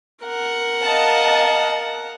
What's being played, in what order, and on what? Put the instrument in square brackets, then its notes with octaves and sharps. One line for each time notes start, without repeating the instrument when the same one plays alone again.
[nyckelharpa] A#4 F#5
[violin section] D#5 F5 A5